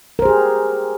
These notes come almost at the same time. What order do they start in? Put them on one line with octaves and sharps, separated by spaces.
A#4 C5 G#4 G4